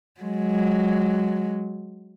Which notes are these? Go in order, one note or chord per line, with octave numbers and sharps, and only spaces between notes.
F#3 G#3